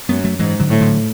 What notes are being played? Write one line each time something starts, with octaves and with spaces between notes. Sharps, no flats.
F#2 G#3 B3
F#3 A3
G#2 E3 G#3
D3 F#3
A2
D3 F#3